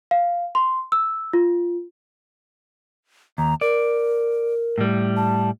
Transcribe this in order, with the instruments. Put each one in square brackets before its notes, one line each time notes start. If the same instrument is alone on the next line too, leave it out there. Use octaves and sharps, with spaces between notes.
[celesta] F5
C6
E6
F4
[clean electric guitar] D#2 [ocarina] A#5
[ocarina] A#4 [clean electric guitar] D5
[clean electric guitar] A2 G3
[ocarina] A5